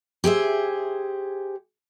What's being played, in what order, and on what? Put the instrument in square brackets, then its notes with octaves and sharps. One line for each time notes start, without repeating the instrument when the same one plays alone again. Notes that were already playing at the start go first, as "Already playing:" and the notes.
[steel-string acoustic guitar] G4 G#4 C5 E5